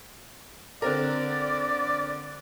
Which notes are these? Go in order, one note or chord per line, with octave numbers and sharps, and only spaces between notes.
D3 C4 A#4 D5